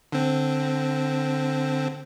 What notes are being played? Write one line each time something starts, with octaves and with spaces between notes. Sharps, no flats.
D3 C4